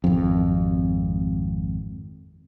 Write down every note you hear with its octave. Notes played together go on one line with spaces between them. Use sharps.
G#1 F2